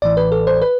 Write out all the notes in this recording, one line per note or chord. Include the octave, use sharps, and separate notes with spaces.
A1 A2 E3 D5
B4
A4
C5
B4